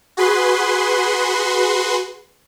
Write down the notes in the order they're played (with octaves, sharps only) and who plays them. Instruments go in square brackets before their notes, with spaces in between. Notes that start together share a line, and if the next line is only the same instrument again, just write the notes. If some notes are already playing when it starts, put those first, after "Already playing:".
[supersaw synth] F#4 G#4 B4 C6